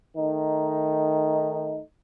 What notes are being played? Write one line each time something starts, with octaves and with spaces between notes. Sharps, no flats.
D#3 A3 D#4